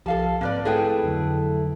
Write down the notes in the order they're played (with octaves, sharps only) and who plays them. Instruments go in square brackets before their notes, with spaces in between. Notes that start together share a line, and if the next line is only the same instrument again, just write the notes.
[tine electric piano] B1 F3 G4 [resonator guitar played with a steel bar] A4 F5 A5
[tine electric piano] G#2 C4 [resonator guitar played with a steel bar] A#3 B4 D5
[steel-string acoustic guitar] A3 E4 A4 [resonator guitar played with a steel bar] G#4 B4 G5
[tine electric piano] F2 D3 F#3